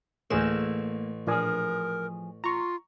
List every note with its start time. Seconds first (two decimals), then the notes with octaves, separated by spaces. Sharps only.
0.31 A1 D2 A3 A#3 G#4 E7
1.27 A#2 F3 D4 G#4 A#4 G#5
2.44 F4 A#5 C#6